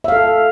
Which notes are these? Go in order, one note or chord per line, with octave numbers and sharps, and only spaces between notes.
A4 E5 F5